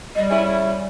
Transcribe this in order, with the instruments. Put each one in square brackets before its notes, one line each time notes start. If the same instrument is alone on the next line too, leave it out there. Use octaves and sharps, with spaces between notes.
[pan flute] G3 [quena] D#5
[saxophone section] G#3 C#4 E4 [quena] E5